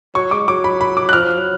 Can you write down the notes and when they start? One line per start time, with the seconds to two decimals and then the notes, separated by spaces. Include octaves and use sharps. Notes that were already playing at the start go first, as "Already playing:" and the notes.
0.15 F#3 C#6
0.31 G#3 D6
0.48 F#3 D6
0.64 B5
0.81 B5
0.97 D6
1.09 F#6
1.13 F3 F6
1.38 F#3